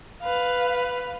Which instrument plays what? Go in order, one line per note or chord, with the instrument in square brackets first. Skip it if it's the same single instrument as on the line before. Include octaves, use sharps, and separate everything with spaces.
[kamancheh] B4 F5